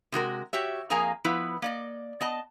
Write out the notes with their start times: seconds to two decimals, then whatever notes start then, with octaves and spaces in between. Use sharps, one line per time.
0.12 C3 G#3 F#4 A#4
0.53 F#4 G4 C#5 E5
0.90 F2 A#3 G#4 A#4 G#5 A#5
1.24 F3 B3 E4 B4
1.62 A#3 D5 D#5
2.21 B3 D#5 A5